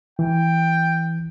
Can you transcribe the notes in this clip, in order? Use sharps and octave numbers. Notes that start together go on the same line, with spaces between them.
E3 G5